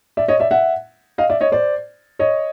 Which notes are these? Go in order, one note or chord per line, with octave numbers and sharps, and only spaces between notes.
D5 E5
C#5 D#5
D5 E5
E5 F#5
D#5 F5
D5 E5
C#5 D#5
C5 D5
C#5 D#5